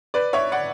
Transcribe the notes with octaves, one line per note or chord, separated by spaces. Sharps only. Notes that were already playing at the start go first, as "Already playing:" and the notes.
B4 D5
C#5 E5
D5 F#5